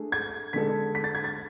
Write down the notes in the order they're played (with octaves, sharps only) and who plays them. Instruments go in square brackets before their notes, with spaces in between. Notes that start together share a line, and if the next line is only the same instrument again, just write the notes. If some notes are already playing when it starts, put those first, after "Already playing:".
Already playing: [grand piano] A3 D4 G#4
[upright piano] G#6
[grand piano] D3 G#3 D4 A4 [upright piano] B6
[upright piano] B6
A6
G#6
A6